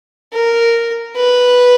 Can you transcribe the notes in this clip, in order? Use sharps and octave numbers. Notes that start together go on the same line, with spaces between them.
A#4
B4